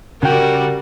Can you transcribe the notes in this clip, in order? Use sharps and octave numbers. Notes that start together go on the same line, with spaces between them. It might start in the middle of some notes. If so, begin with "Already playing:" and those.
C#3 G3 F#4 A#4 G5